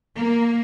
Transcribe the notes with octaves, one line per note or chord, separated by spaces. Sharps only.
A#3